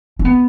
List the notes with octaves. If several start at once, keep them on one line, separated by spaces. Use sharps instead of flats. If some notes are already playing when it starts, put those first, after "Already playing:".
D4
B3